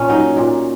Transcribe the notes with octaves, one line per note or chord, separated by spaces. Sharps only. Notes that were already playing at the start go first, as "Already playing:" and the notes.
Already playing: A#2 C#4
F#3 D#4
A#2